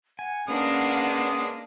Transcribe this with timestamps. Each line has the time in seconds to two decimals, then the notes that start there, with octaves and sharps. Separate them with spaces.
0.19 F#5 G#5
0.48 G#3 A#3 B3 C#4 D4 D#6